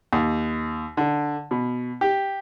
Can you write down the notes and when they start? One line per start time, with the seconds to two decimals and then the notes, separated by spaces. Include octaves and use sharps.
0.13 D#2
0.97 D3
1.51 B2
2.01 G4